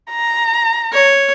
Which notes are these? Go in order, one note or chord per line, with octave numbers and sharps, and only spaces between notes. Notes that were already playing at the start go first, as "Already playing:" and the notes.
A#5
C#5